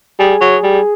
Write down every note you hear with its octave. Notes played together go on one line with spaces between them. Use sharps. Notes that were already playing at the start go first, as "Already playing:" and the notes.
G3 G#4
F#3
G3